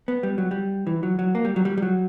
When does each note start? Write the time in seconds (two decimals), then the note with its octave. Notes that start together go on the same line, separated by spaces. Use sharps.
0.08 B3
0.23 G3
0.38 F#3
0.51 G3
0.87 E3
1.03 F#3
1.19 F#3
1.35 A#3
1.45 G3
1.56 F#3
1.65 G3
1.78 G3
1.82 F#3